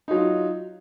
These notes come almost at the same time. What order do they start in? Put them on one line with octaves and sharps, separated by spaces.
D#4 F#3 F4